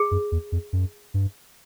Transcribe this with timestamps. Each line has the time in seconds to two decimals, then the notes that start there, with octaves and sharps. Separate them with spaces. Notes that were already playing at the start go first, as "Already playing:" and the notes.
Already playing: G#4
0.11 F#2
0.32 E2
0.52 F2
0.73 F#2
1.14 G2